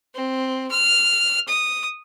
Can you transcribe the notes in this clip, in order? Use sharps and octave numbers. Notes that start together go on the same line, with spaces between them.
C4
F6
D#6